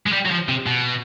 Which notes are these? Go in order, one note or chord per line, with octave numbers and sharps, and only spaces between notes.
G#3
G3
F#3
F3
C3
B2